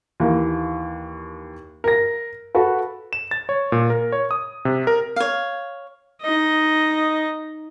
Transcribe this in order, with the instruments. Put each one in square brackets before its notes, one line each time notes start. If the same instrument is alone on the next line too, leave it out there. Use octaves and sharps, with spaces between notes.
[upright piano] D#2 E3 A#4
A#4 A#6
F#4 A4 B4
[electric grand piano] E7
A6
C#5
A#2
A#4
C#5
D#6
C3
A#4
[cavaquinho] C#5 F5
[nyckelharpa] D#4 D#5